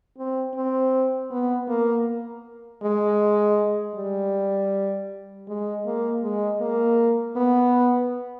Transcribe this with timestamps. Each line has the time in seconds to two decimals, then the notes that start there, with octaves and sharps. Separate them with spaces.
0.18 C4
0.55 C4
1.31 B3
1.69 A#3
2.83 G#3
3.95 G3
5.48 G#3
5.86 A#3
6.23 G#3
6.61 A#3
7.36 B3